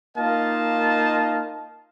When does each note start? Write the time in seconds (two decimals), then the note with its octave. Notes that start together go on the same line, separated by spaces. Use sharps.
0.17 A#3 D#4 F4 D#5 F5 A5